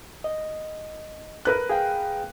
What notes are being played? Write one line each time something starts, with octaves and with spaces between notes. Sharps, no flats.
D#5
A#4 B4 F#6
G#4 F5 G5